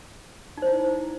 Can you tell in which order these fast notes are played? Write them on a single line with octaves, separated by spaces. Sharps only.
D#4 C5 E4